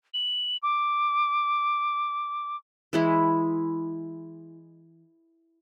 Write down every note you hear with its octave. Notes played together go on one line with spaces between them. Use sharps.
F#7
D6
E3 G#3 E4